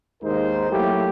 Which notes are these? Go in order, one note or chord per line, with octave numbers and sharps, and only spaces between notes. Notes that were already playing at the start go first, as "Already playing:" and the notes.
D#2 G#3 A#3 D#4 A#4 C5
F#3 A3 A#3 E4 G4